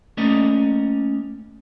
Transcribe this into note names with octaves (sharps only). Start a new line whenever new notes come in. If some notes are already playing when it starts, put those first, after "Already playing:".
A3 A#3 C#4 A#4 D5 D#5